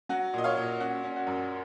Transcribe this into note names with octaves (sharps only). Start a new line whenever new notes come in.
F#3 F#4
A#2 D#5
C#5 F5
A#2
C#4 F#4
C#4
F#4
F#2